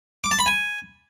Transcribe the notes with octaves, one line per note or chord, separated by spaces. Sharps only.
D6
A5
B5
G#5